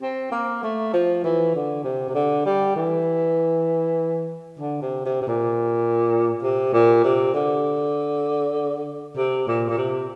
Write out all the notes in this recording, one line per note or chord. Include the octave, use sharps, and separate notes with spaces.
C4
A#3
A3
F3
E3
D3
C3
C3
D3
G3
E3
D3
C3
C3
C3
A#2
C3
A#2
C3
D3
C3
A#2
A#2
C3